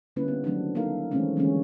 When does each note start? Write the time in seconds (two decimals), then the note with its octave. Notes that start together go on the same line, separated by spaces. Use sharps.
0.16 D3 G3 A#3 C#4 E4 B4
0.28 B3
0.44 D#3 F#3 A3 C4 D4
0.75 A#3 D#4 E4 A4 A#4 F5
1.11 D#3 E3 G#3 A3 C4 C#4
1.36 D3 E3 G3 G#3 A#3 C#4